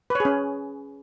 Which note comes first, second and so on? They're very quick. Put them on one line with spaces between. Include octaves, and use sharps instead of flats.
B4 C#5 G#4 C#4